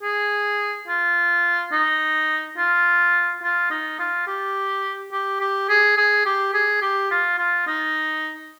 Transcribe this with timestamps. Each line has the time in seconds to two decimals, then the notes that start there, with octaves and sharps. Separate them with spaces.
0.03 G#4
0.88 F4
1.72 D#4
2.58 F4
3.43 F4
3.71 D#4
4.00 F4
4.27 G4
5.12 G4
5.41 G4
5.69 G#4
5.97 G#4
6.26 G4
6.54 G#4
6.82 G4
7.11 F4
7.39 F4
7.67 D#4